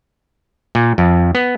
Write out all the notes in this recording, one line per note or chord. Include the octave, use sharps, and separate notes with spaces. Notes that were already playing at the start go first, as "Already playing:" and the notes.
A#2
F2
B3